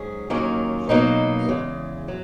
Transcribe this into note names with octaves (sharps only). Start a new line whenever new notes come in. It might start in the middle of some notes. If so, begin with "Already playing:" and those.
Already playing: G#2 F#3 C#4 G#4
D#2 D#3 F#3 A#3 C#4
B2 F#3 A#3 D#4
E2 C#3 G#3
F#3